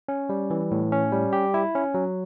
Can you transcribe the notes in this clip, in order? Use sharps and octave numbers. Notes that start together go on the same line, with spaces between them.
C#4
G3
E3
A2
C#4
G3
G4
E4
C#4
F#3